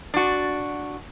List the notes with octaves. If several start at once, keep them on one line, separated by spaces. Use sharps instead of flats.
D4 F#4